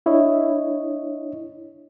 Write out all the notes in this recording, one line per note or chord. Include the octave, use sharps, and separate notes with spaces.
D4 E4 C#5 D#5